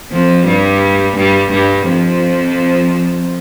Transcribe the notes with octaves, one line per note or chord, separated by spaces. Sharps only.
F2 F3
G2 G3
G2 G3
G2 G3
F2 F3